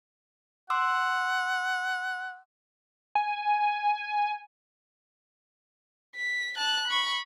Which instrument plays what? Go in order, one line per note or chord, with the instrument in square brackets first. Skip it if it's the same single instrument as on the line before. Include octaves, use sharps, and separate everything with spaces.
[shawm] F#5 [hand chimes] C6 D6 E6
[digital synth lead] G#5
[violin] B6
A5 F#6
B5 C#6